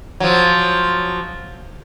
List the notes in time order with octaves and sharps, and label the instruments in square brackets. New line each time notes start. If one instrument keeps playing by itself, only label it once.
[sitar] F3 F#3